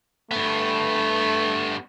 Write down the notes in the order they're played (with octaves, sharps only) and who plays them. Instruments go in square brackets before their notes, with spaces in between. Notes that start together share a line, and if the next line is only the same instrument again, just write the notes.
[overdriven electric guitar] G2 B3 [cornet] A3